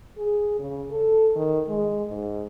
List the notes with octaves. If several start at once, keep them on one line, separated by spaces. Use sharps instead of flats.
G#4
C#3
A4
D#3
G#3
G#2